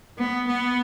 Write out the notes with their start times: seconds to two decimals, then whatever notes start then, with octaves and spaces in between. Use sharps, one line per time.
0.18 B3
0.47 B3